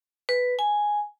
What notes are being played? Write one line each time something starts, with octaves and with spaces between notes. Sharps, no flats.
B4
G#5